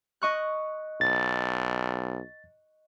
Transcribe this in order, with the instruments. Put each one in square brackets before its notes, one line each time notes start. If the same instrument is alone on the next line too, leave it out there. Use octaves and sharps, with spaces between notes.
[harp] D#5 C#6 F#6
[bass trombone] B1 [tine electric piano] A6